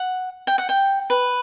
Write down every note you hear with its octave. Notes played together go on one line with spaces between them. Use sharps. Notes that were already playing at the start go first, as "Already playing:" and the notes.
Already playing: F#5
G5
F#5
G5
B4